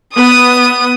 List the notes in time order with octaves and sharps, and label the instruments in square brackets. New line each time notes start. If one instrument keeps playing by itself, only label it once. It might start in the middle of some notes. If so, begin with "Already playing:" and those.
[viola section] B3 [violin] D#6 D#7